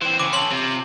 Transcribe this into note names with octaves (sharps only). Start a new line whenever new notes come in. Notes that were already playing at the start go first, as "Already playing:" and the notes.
E3 C4 C5
C#3 D6
C#4 A4 C6 F#7
C3 C4 F4